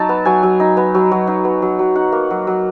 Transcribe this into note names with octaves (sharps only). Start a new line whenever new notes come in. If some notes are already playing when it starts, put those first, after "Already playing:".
Already playing: F#3 D#4 A5
B3
F#3 G#5
F#3
D#4
B3
F#3
F#3
D#4
B3
F#3
F#3
D#4 F#5
A#3
F#3
F#3